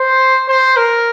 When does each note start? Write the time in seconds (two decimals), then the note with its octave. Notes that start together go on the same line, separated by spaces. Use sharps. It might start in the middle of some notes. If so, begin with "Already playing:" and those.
Already playing: C5
0.48 C5
0.77 A#4